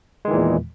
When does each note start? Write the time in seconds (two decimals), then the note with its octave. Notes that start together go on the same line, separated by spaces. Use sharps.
0.25 G#3
0.28 D#3
0.31 E3
0.34 A#2
0.36 E2